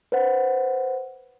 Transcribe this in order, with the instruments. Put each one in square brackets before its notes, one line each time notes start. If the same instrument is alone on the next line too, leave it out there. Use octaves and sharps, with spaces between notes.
[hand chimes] B4 C5 F#5